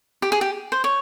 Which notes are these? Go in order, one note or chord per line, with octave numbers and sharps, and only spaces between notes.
G4
G#4
G4
C5
C#5